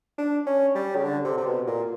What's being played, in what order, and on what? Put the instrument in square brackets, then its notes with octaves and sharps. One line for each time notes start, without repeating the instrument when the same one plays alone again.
[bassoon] D4
C#4
G3
C#3
D3
C3
C3
B2
A#2